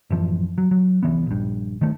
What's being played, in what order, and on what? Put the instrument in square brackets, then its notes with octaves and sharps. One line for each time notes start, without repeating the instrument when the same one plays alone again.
[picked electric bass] A1 F#2 E3 F3
F#3
F#3
C2 E3 B3
A#1 G2
D#3 A3